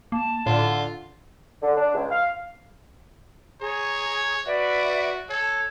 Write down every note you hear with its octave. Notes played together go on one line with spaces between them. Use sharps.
A#3 A5
A2 D3 F4
D3
D4
C#2
F5
G#4 C#5 A#5
F#4 B4 D5 E5
A4 C#5